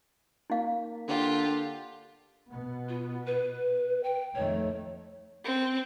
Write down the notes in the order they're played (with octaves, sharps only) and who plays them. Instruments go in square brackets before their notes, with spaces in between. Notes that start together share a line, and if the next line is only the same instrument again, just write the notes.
[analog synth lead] A#3 [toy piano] D#4 F5
[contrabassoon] D3 [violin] F4 G4
[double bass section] B2 B3
[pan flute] F4
B4
G5
[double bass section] F2 D#3 A3 [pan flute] C#5
[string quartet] C4